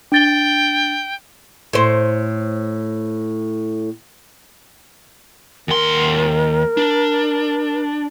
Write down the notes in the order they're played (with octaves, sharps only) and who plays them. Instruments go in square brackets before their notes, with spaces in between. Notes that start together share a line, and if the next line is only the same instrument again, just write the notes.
[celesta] D4 A6 G7 [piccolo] G5
[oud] A2 C5
[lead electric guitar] D#2 C6 [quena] A#4
[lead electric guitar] D4